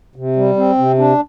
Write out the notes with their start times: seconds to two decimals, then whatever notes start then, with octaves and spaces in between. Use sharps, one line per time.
0.16 C3
0.36 G3
0.57 C4
0.78 C3
0.98 D4